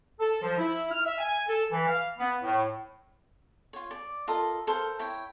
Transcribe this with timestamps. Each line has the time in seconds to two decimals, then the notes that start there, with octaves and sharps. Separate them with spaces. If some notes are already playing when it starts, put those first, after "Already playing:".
0.19 A4
0.42 F3
0.58 E4
0.91 F6
1.05 E5
1.18 G#5
1.48 A4
1.72 E3
1.87 F5
2.18 B3
2.43 A2
3.73 F4 C#5
3.91 D5
4.28 F4 A4 A#4 D#5
4.67 A4 A#4 C5 F5
4.99 E4 C#5 G5